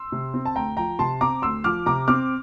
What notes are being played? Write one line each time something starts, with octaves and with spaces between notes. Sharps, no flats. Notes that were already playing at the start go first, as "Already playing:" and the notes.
Already playing: C6 E6
C3
C4
A5
D2 G5 A#5
F3 G5 A#5
C3 A5 C6
C4 A#5 D6
D2 C6 E6
F3 D6 F6
C3 A#5 D6
C4 D6 F6